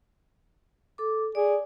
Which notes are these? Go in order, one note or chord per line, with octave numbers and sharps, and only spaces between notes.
A4 D6
G#4 D5